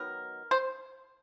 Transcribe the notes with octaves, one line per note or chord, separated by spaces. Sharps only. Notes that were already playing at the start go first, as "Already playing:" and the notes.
Already playing: D#3 F#3 B3 A#4
C5